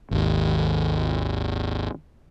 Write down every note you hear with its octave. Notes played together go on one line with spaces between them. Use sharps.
G#1 D#2